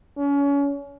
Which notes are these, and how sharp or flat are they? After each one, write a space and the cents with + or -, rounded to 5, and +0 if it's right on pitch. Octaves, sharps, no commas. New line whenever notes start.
C#4 +30